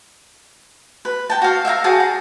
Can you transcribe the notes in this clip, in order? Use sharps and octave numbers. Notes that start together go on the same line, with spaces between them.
B4
G5 A5
F#4 F5
E5 F5 G5 A#5
F#4 G#4 G5 A5
A#5